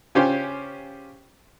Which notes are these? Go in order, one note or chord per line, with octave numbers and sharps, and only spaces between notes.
C#3 C#4 F4 G4 C5 G#5